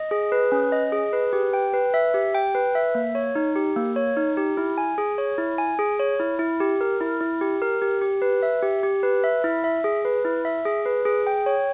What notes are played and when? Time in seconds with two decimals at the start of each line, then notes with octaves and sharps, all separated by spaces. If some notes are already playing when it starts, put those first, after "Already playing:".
Already playing: D#5
0.11 G#4
0.32 B4
0.52 C#4
0.72 D#5
0.92 G#4
1.13 B4
1.33 G4
1.53 G5
1.74 B4
1.94 E5
2.14 G4
2.35 G5
2.55 B4
2.75 E5
2.95 A#3
3.15 C#5
3.35 D#4
3.56 G4
3.76 A#3
3.96 C#5
4.17 D#4
4.37 G4
4.57 E4
4.78 G#5
4.98 G#4
5.18 C#5
5.38 E4
5.58 G#5
5.79 G#4
5.99 C#5
6.20 E4
6.39 E4
6.60 G4
6.81 A#4
7.01 E4
7.21 E4
7.41 G4
7.62 A#4
7.82 G4
8.02 G4
8.22 B4
8.43 E5
8.62 G4
8.83 G4
9.03 B4
9.24 E5
9.44 E4
9.64 E5
9.84 G#4
10.05 B4
10.25 E4
10.45 E5
10.65 G#4
10.86 B4
11.05 G#4
11.27 G5
11.46 C#5